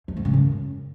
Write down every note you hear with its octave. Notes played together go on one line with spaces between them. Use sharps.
F2
G#2
C#3
F#2